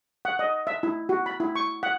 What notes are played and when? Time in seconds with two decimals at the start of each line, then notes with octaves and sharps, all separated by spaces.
0.25 F#5
0.39 D#5
0.67 E5
0.83 E4
1.09 F#4
1.26 B5
1.40 E4
1.55 C#6
1.83 F#5